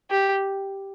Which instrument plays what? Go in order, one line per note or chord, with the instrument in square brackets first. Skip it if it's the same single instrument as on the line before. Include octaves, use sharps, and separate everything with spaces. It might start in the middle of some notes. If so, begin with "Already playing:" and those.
[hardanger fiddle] G4